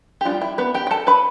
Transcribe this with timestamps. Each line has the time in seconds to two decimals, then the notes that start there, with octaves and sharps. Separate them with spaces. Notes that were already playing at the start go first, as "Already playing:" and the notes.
0.21 G4
0.25 G3 B3 D4 F4
0.41 E4
0.58 B3 B4
0.74 G4 G5
0.87 G5
0.91 A4 A5
1.07 B4 B5